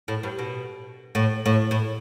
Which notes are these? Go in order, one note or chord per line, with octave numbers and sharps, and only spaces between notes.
A2
G2
B2
A2
A2
A2